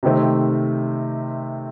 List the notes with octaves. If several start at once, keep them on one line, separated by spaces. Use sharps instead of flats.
C3 D#3 A3 C4